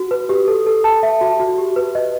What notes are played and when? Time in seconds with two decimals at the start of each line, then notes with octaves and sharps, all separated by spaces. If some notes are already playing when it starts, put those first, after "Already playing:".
Already playing: F#4
0.11 B4
0.29 G4
0.48 A4
0.66 A4
0.84 A5
1.03 E5
1.21 F#4
1.40 F#4
1.58 G4
1.76 B4
1.95 D#5